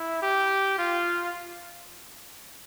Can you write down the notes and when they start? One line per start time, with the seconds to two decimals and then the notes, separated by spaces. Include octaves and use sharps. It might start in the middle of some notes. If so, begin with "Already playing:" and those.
Already playing: E4
0.22 G4
0.78 F4